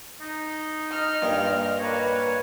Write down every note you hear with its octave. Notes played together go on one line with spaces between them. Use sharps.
D#4
D#5 F6
G2 A#2
A#3 B4 C#5